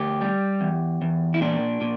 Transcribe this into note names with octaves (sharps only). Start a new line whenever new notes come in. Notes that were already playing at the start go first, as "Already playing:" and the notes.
Already playing: D2 G4
G3
E2
E2
E4
A#2 D4
A#2